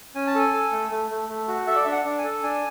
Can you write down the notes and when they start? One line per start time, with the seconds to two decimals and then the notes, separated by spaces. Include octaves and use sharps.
0.15 C#4 G#5
0.27 A5
0.35 A4 G#5
0.53 A4
0.72 A3
0.91 A3
1.10 A3
1.29 A3
1.48 F#4
1.67 A4 E5
1.75 D5
1.84 D4 E5
1.92 F#5
2.05 D4
2.18 G#5
2.24 A4
2.43 D4 G#5